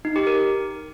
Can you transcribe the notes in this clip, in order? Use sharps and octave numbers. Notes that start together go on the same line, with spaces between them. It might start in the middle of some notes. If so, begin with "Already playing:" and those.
D#4
G4
A#4